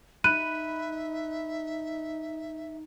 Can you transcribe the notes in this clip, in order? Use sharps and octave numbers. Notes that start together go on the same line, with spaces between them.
D#4 E5 B5 F#6 D#7